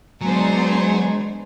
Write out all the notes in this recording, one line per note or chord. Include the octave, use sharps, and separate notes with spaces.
F#3 G#3 B3 D4 C5 G#5 A#5